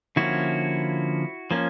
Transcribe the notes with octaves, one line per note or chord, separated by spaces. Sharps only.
D3 F3 A#3 C#4 E4 F#4
F3 A#3 C#4